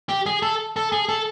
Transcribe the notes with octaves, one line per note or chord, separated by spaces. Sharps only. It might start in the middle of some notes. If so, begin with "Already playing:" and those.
G4
G#4
A4
A4
G#4
A4